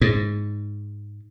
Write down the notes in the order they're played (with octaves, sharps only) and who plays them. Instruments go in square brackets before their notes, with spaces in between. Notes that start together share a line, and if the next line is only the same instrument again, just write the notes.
[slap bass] G#2